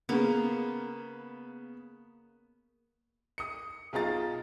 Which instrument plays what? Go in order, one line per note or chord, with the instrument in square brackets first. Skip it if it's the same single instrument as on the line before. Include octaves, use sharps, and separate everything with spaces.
[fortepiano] C#3 B3 [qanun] A#3
[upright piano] D#6 C#7
B1 F4 G#4 A#5 A6